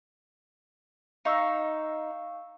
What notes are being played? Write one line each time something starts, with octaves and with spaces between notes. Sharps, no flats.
D#4 F5 C#6 E6